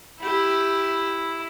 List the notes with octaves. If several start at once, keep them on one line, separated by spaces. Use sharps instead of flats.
E4 G4 E5